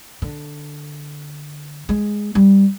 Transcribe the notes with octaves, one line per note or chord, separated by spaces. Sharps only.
D3
G#3
G3